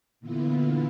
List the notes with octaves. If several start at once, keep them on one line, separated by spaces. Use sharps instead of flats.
A#2 D3 E3 B3 E4 F4